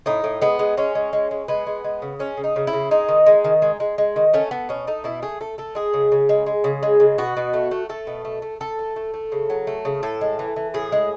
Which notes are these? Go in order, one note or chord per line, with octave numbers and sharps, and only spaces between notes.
A2 D#4
A2
G#3 B3
G#3
G#3 C#4
G#3
G#3
G#3
G#3 B3
G#3
G#3
C#3
G#3 C#4
C#3
D#4
C#3
E4
C#3
G#3 D#4
D#3
G#3
D#3
G#3
G#3
G#3
D#3
A3 C#4
A3 B3
B2 C#4
A3 D#4
B2 E4
A3 G#4
A3 A4
A3 A4
G#3 G#4
C#3
C#3
G#3
G#3
C#3
G#3
C#3
B2 F#4
B2
A3
A3
A3 A4
B2
A3
A3
A3 A4
A3
A3
A3
C#3
F#3
A3
C#3
A2 A4
G#3
E3
E3
A2 G#4
G#3